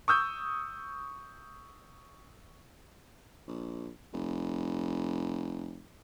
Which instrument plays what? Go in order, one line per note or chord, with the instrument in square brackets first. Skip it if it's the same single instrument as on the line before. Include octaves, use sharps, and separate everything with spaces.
[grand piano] C#6 D#6 E6 G6
[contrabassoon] A#1
F1